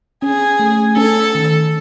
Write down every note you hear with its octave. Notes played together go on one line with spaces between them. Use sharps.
C#4 G#4
A3
C#4 A4
D#3